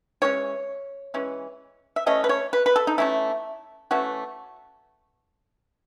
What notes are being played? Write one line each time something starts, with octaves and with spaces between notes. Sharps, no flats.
E3 G#3 C#4 C#5
E3 G#3 C#4
E5
E3 A3 C#4 D#5
B4
C#5
B4
B4
A4
D#4
E3 A3 C#4 E4
E3 A3 C#4 F#4